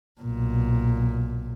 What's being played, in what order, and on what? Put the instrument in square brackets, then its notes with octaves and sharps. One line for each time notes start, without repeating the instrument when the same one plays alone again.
[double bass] B1 A#2